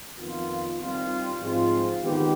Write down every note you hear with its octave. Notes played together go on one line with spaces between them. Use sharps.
F2 D#3 B3 F4
D#3 G3 C4 F4
G#2 F3 G#3 C4 F4
D#3 G#3 B3 D#4 G4